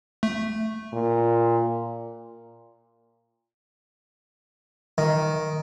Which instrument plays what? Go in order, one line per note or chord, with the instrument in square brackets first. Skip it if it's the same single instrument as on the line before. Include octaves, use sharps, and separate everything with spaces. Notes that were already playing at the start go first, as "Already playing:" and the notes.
[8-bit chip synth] A3
[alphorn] A#2
[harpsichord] D#3